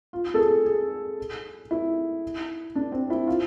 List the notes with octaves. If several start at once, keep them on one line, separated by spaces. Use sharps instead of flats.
F4
A4
G#4
G#4
E4
D4
C4
E4
F4